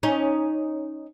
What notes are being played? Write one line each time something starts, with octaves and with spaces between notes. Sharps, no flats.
C#4 D#4